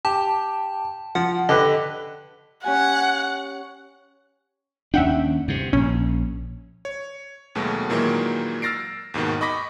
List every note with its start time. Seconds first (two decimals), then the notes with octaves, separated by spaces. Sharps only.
0.05 G4 A5
1.15 F3 F#5
1.49 D3 G4 B4 D#5
2.64 C#4 G4 F#5 G#5
4.94 D#2 C#4 D4 E5 F#5 G5
5.48 G2 C3
5.73 A#1 C#4
6.85 C#5
7.55 D#2 B2 F#3 G#3 A3
7.90 A#2 D#3 E3 F#3 G#3 A#3
8.62 E6 F6 A6 A#6 C7 D7
9.14 D#2 G#2 B2 D#3
9.41 D#5 B5 C#6 D6 A#6 B6